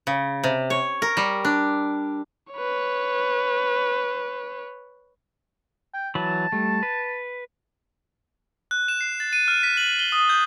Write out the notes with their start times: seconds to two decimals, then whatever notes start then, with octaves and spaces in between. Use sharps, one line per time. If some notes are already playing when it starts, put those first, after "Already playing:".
0.07 C#3
0.43 C3
0.70 C#5
1.02 A#4
1.17 G3
1.45 D4
2.53 B4 C#5
5.94 G5
6.15 E3 F#3 A5 B5
6.52 G3 A3
6.83 B4
8.71 F#6
8.88 E7
9.01 C7
9.20 A6
9.33 D#7
9.48 F6
9.63 B6
9.77 F#7
9.99 G7
10.12 D#6
10.29 G6